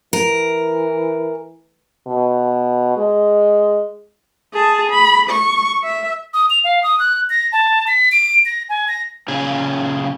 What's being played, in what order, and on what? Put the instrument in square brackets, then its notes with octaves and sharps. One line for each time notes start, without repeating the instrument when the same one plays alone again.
[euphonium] E3 [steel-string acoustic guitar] A#4
[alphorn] B2
G#3
[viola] G#4 A5
B5
C#6
E5
[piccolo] D#6
F7
F5
D#6
F#6
A#6
A5
B6
D7
A#6
G#5
A#6
[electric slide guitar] A#2 C#3 G#4